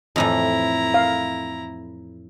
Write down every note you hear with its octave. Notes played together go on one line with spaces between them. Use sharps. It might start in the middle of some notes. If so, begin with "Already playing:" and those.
F2 A2 E3 E4 A#5
F5